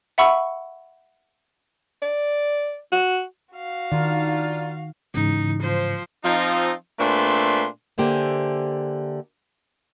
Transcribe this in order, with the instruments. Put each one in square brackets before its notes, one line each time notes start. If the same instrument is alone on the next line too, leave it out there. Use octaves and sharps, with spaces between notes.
[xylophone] E5 F#5 B5 C#6 E6
[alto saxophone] D5
F#4
[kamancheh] F#4 F5
[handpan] D#3 [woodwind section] D4 D#4 F4
[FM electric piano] G#2 C#3 E3 [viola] D#4
[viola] F3 C5
[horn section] F3 C4 D#4
A#2 A3 C4 D4 B4 C6
[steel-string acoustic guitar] D3 A#3 G4 C5 E5 G#5